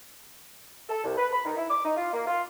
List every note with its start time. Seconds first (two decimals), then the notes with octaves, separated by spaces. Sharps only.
0.89 A4
1.04 C2
1.18 B4
1.32 B5
1.45 D#3
1.57 E4
1.70 D6
1.84 D#4
1.96 F4
2.13 A#3
2.26 F4